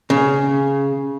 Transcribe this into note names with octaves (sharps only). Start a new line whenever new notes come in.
C#3